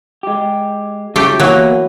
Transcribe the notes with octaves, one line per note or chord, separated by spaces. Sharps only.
G#3 G4
C#3 F#3 A3 G4
E3 F#3 A#3 B3